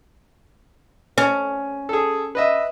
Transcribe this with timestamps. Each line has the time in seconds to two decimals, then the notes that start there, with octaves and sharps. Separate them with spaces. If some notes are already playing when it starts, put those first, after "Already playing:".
1.18 C#4
1.89 G#4 A4
2.35 B4 D#5 E5